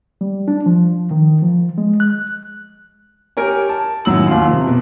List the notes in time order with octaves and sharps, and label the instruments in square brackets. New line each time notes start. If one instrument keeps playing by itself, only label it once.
[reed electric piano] G3
D4
F3
D#3
F3
G#3
F#6
[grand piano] G4 A#4 C#5 G#5
A5
A1 D#3 F#3 E6 F#7
D#2 F4 F5 C6
C3 F3
B2